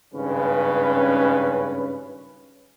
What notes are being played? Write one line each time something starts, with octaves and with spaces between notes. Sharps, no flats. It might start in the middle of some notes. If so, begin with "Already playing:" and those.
G#1 G2 C#3 C#4 B4